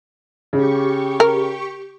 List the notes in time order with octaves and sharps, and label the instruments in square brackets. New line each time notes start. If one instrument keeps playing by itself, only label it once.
[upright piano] C#3 [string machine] G4 C#6
[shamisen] A#4